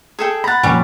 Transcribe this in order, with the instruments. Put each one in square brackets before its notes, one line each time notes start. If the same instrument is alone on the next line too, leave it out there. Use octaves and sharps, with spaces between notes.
[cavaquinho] G#4 A4 G5
[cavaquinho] F#5 A#5 [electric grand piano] B5 A6
[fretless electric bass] F2 A#2 [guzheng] G3 C#4